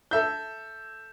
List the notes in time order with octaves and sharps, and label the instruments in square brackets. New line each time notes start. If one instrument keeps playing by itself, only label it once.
[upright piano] A4 E5 G6